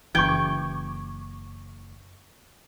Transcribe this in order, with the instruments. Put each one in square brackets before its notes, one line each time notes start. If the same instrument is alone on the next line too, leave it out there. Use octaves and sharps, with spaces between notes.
[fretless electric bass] F#1 E3 [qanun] G5 [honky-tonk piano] C#6 D6 G#6